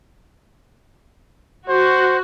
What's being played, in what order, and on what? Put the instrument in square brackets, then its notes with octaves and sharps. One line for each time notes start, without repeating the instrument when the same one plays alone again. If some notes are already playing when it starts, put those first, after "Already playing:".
[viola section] F#4 [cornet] C5